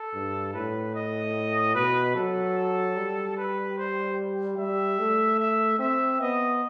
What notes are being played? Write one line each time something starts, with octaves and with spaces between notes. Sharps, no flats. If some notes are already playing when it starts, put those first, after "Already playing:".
Already playing: A4
G2
A2 B4
D#5
B2 B4
F#3 A4
G3
B4
C5
G3 E5
A3
E5
C4 E5
B3 D#5